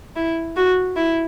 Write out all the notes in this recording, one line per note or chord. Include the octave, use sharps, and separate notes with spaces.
E4
F#4
E4